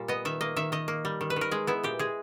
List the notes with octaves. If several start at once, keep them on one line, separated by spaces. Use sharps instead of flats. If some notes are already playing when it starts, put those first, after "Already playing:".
Already playing: A#2 G3
B3 D#5
D#3 E5
A#3 D#5
D#3 E5
D#3 D#5
A#3
G3
D#3
B4
D#3 A#4
G#3 G#4
B3 E4
A#2 G4
G#3 G#4